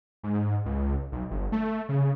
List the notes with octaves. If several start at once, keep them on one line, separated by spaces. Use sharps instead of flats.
G#2
C#2
B1
G1
A3
C#3